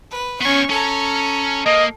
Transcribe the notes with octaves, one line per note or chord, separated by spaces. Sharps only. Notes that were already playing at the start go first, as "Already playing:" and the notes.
B4
B3 C#4 G#5 C#6
C#4 A4 A#5
A#3 D#5